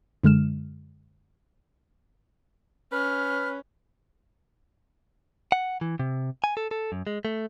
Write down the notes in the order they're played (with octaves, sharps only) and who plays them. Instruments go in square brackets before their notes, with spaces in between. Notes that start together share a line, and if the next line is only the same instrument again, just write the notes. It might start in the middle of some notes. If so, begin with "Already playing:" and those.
[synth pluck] F#2 D3 G#3 F6 E7
[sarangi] C#4 [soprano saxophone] B4 [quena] F6
[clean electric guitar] F#5
E3
C3
G#5
A4
A4
F#2
G#3
A3